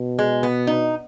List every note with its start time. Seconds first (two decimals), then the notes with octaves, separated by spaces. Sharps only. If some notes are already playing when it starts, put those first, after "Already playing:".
Already playing: B2
0.19 G#3
0.43 B3
0.67 D#4